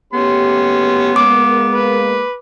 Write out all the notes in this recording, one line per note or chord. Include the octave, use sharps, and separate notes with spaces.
F#1 A3 B3 C#4 G4 C6
G#3 A#3 D6
B4